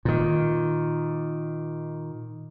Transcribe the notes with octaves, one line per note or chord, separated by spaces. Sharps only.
A#2 D#3